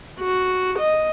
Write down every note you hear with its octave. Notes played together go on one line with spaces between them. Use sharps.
F#4
D#5